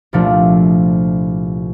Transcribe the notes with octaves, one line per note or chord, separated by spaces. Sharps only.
C2 A#2 F3 A3 D4